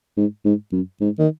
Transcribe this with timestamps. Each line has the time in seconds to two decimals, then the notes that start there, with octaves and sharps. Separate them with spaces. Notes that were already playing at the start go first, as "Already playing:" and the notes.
0.17 G#2
0.45 G#2
0.72 F#2
1.01 G#2
1.19 D#3